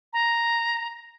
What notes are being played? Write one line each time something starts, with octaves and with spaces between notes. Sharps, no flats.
A#5